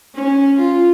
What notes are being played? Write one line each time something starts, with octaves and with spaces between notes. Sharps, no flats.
C#4
F4